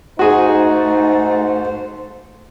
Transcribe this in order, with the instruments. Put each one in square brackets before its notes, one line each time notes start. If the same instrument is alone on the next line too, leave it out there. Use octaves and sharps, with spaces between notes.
[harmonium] G#2 C5 [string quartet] A3 [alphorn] D#4 [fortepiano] F#4 G#4